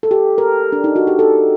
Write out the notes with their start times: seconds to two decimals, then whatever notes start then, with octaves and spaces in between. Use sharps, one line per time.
0.03 A4
0.11 G4
0.38 A#4
0.72 D4
0.84 D#4
0.96 F#4
1.07 G4
1.19 A4